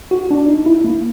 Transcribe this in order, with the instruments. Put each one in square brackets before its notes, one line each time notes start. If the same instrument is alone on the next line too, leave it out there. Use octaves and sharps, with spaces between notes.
[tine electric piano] F#4
D4
D#4
E4
A#3